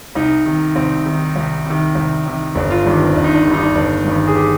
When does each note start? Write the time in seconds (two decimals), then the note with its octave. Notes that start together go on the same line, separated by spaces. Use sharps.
0.15 C2 D#4
0.45 C3 D#3
0.75 C2 C4
1.05 C3 D#3
1.36 C2
1.65 C3 D#3
1.95 C2
2.26 C3 D#3
2.55 G1 D4
2.70 F4
2.85 G2 D#3 G3 D4
3.00 C4
3.15 G1 D4
3.24 D#4
3.34 D4
3.45 G2 D#3 G3 D4
3.54 D#4
3.63 D4
3.75 G1 D4
4.05 G2 D#3 G3
4.27 G#4
4.35 G4